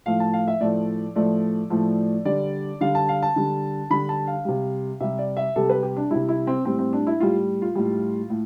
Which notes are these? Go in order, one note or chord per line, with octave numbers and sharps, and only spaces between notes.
A2 F3 A3 F5
A5
F5
E5
A2 F3 A3 D5
A2 F3 A3 D5
A2 F3 A3
D3 G3 D5
D3 G3 F5
A5
F5
A5
D3 G3
D3 G3 B5
A5
F5
C3 G3
C3 G3 E5
D5
E5
C3 G3 A4
B4
G4
D4
C3 G3 E4
E4
C4
A2 G3 C4
C4
D4
E4
A2 G3 F4
F4
A2 G3
A2